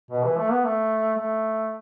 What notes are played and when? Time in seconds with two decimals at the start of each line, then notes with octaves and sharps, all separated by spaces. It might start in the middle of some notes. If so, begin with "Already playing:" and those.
0.11 B2
0.24 E3
0.37 A3
0.51 B3
0.64 A3
1.18 A3